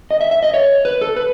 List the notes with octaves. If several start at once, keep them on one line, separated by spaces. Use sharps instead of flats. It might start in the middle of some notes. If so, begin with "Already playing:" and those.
D#5
E5
E5
D#5
C#5
B4
A4
B4